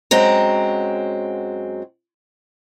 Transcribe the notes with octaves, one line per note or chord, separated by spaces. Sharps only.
F#2 F#3 G#3 C4 A#5